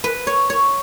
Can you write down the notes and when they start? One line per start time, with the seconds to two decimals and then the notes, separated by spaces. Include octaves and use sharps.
0.04 B4
0.27 C#5
0.50 C#5